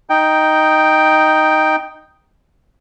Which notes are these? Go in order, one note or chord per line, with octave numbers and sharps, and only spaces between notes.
D#4 G5